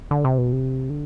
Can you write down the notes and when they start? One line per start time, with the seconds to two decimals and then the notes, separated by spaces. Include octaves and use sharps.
0.11 D3
0.24 C3
0.38 B2
0.52 C3
0.90 D3